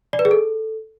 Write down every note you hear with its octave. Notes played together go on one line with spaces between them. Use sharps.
D5
B4
G#4
A4